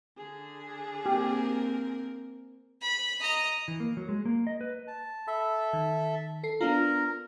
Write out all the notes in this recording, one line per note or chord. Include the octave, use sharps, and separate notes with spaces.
D3 G#4
A#3 C4 G4 A#4
B5
D#5 A#5
E3
A#3
F#3
G#3
A#3
D#5
B4
A5
A4 E5 B5
D#3
A4 C7
B3 D4 F4 A#4 A#5